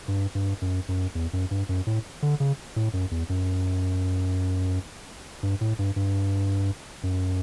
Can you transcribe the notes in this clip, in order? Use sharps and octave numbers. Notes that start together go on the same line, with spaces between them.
G2
G2
F#2
F#2
E2
F#2
G2
F#2
A2
D3
C#3
A2
F#2
E2
F#2
G2
A2
G2
G2
F#2